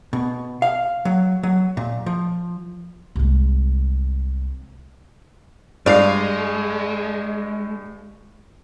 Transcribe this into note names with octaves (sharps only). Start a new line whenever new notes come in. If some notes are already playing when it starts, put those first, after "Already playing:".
B2
F5
F#3
F#3
A#2
F3
C2 G#3
G2 G#3 D5 F5 C7